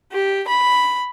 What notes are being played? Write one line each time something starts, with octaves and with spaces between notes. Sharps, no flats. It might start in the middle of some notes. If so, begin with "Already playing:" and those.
G4
B5